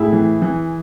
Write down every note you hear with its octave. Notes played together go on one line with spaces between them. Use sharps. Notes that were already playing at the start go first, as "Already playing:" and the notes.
Already playing: A2 E4 G#4
E3
E3